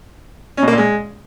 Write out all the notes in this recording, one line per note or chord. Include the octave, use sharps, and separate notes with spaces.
C#4
B2
A#3
A#2
G#3